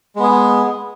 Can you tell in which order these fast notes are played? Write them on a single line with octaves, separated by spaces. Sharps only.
G#3 B3 G#4